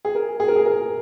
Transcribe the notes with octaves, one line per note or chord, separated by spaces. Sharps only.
G#4
A#4
G#4
A#4
G#4
A#4